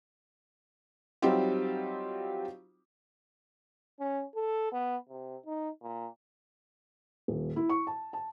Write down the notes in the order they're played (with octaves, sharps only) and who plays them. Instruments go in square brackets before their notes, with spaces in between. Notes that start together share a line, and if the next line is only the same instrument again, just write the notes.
[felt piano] F#3 G3 C4 D#4 F4 G4
[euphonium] C#4
A4
B3
C3
D#4
A#2
[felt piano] D#1
E4
C#6
A5
A5